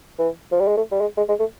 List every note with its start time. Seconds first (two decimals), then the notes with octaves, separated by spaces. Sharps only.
0.19 E3
0.52 F3
0.60 G3
0.68 G#3
0.77 A3
0.92 G3
1.01 G#3
1.17 G#3
1.29 G#3
1.40 A3